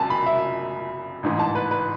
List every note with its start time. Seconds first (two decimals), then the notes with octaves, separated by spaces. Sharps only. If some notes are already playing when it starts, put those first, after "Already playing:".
Already playing: F#1 F#2 C#3 F#3 G#5 A5
0.10 B5
0.26 E5
1.23 A1 G#2 E3
1.39 A5
1.55 B4
1.71 B4